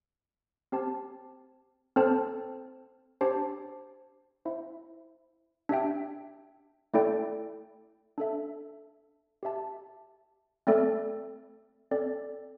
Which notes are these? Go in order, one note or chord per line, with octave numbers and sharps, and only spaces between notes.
C4 G4 C5 A5
C4 A4 C5 A5
D4 G4 C5 A5
E4 C5 E5
D4 G4 E5 G5
A3 E4 A4 D5 G5
D4 A4 E5
G4 E5 A5
A3 C4 A4 D5
C4 A4 D5